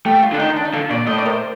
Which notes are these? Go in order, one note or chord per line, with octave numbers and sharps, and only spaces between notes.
A3 G4
F4
D3 D4
D#3 D#4
D4
D#4
D3 F4
A#2 D5
A2 D#5
D5
A#4
C5